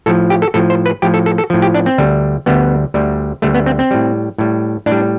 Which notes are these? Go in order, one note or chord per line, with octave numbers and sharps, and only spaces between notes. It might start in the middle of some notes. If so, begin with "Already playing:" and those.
A2 F3 A4
G4
A4
A2 F3 A4
C5
B4
A2 F3 G4
A4
A4
A4
A2 F3
G4
D4
C4
D2 D3 G3
D2 D3 G3 B3
D2 D3 G3
D2 D3 G3 A3
B3
C4
C4
A2 G3
A2 G3
A2 D4
G3